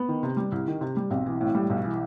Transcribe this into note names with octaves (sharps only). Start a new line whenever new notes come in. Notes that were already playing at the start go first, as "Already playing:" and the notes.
Already playing: B3
D#3
C3
G3
C2
D#3
C3
G3
B1 C4
E3
A2
G3
B1
E3